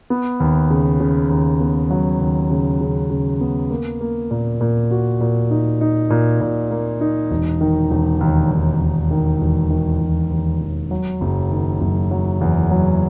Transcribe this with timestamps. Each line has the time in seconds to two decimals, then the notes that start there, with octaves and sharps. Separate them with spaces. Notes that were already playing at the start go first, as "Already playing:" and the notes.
0.10 B3
0.40 D#2
0.70 C#3
1.00 C#3
1.30 D#2
1.61 B3
1.90 F#3
2.20 D#2
2.51 C#3
2.81 C#3
3.10 C#3
3.41 B3
3.70 A#3
4.01 A#3
4.31 A#2
4.61 A#2
4.91 F#4
5.21 A#2
5.51 D#4
5.81 D#4
6.10 A#2
6.41 A#2
6.70 A#3
7.01 D#4
7.31 E1
7.61 D#3
7.91 E1
8.21 D#2
8.51 D#2
8.81 D#2
9.11 D#3
9.41 E1
9.70 D#3
10.01 E1
10.31 D#2
10.61 E1
10.91 F#3
11.21 F#1
11.51 D#3
11.81 F#1
12.11 F#3
12.41 E2
12.71 F#3